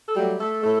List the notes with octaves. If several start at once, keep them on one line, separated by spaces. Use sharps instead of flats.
A4
F#3 G3 A3 G4
A3 A4
A2 A3 A4